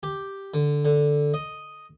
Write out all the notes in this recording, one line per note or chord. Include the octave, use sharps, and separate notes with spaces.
G4
D3
D3
D#5